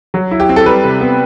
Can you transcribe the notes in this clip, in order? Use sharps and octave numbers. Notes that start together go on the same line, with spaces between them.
F#3
E4
G4
C4
A4
G3 B4
C3
B3